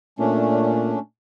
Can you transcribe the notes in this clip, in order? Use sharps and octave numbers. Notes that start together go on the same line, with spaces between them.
A#2 A3 C#4 D4